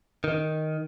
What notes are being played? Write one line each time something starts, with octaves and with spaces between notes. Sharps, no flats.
D#3